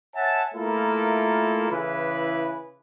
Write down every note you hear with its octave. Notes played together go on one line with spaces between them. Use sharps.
C#5 E5 F#5 G#5 A5
A3 A#3 E4 F4 A4 A#4
C#3 E3 E4 G#4 B4